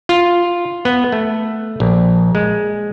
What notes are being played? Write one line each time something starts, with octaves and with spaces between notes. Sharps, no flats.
F4
B3
A3
A#1
G#3